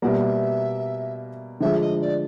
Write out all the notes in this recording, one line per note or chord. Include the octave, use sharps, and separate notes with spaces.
B2 G3 A#3 E5 F#5
D3 F3 G#3 E5
D#5
D5